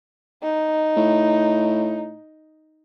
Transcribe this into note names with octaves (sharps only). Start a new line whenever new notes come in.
D#4
A2